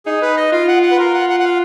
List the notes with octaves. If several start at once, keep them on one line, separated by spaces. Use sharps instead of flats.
D#4 G#4
B4
D#5
F4 F5
F#5
F#5
B4
F4 A#4
F#5
F#5
F#5
F5